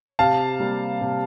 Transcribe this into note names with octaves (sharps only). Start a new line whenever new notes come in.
C3 F5 A5
G3 A#3
C3